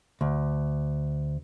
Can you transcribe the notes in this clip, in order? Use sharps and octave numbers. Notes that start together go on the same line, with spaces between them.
D2